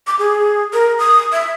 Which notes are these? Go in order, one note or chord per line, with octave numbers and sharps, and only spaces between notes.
D6
G#4
A#4
D#6
E5